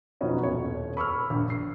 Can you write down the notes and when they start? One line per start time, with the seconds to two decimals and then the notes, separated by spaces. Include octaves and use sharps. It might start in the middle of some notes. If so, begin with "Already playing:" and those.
0.21 B2 F3 F#3 B3 C#4 D#4
0.43 D#1 C#5
0.97 B5 C#6 E6 F6
1.30 A#1
1.50 C7